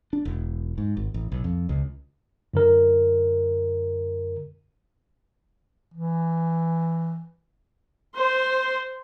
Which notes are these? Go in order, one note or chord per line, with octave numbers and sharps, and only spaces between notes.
D4
E1
G#2
G#1
A1
B1
F2
C#2
F#2 D3 A#4
E3
C5